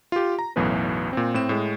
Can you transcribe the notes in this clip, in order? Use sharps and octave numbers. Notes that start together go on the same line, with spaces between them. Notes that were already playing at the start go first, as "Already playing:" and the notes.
F4 G4
A#5
B1 F#2 A2 E3 B3 B4
A#2 C4
A2 C4 E7
A2 G#3